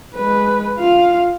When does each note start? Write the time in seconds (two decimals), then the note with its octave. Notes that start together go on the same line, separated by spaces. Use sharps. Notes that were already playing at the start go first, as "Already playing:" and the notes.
0.15 G#3 B4
0.79 F4 F5